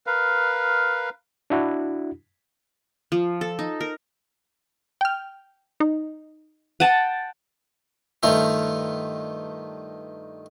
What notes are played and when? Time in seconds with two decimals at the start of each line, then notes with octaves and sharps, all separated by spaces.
0.07 A#4 B4 F5
1.50 D4 E4 F#4
3.12 F3
3.41 A4
3.59 D#4
3.81 A#4
5.01 G5 F6
5.80 D#4
6.80 F#5 G5 A5 D#7
8.23 G2 D#3 A3 F4 C5 E5